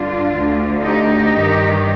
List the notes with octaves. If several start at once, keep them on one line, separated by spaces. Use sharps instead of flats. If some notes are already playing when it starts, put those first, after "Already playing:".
Already playing: G2 D3 D4 F4
D2 D3
D#4 G4
G2 D#3